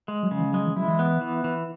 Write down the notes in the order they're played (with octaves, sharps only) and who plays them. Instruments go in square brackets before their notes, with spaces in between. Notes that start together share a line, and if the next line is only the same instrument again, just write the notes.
[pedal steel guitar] G#3
[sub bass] F#3
[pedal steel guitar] C#3
[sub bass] E3
[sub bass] F#3 [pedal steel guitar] G#3
[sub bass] E3
[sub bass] F#3 [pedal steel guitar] E4
[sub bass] E3
[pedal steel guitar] B3
E3
E3